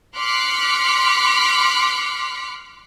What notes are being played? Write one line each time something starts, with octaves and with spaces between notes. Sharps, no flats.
C6 D6 F6 F#6 B6 C#7